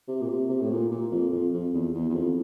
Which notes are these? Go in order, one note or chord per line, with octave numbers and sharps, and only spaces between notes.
C3
A#2
C3
C3
A2
A#2
A#2
F2
F2
F2
E2
E2
E2
F2